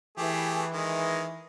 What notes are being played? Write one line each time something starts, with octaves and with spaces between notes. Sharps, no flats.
E3 A3 G4 G#4
D#3 G#3